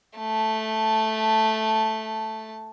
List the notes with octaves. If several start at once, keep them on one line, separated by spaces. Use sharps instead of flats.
A3 A5